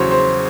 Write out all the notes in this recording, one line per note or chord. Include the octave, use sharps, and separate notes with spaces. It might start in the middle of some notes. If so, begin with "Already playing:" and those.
Already playing: E2 C#3 F#3 C5 C#5
C5